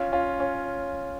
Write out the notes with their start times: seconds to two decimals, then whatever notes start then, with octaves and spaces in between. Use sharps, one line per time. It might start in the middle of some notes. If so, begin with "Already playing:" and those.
Already playing: C#4 F4
0.12 C#4 F4
0.40 C#4